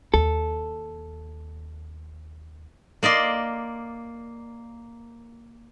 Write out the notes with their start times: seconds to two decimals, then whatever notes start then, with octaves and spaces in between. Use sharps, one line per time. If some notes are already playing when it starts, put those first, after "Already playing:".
0.14 D#2 A4
3.03 A#3 D5 D#5 C6